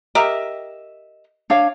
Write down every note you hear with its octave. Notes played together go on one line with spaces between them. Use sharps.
G4 A#4 D#5 E5
D4 C#5 F5